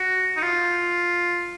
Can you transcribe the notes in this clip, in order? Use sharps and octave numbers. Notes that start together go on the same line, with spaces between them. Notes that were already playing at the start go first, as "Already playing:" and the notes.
Already playing: F#4
D#4
F4